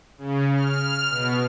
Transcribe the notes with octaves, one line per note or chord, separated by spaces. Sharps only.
C#3
F6
B2